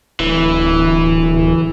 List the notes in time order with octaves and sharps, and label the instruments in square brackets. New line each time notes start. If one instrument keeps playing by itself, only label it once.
[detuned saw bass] D1 [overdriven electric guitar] E3